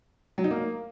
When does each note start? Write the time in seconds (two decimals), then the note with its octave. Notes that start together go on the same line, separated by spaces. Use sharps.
0.38 F#3
0.44 D#4
0.51 A#3